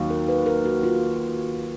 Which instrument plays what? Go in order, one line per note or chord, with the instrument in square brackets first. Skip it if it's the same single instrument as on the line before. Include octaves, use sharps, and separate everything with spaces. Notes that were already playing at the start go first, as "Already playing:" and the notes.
Already playing: [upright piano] D#2 F#3
[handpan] A#4
B4
A#4
F#4
F4